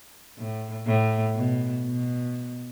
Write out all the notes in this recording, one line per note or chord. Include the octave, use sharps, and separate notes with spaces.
A2
A2
B2
B2